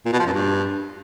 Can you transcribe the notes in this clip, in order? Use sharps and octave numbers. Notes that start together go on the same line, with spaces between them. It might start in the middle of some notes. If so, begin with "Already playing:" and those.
A#2
B2
F3
F#2
G2